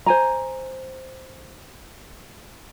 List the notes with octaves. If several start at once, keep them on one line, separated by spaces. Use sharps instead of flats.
C5 G#5 A#5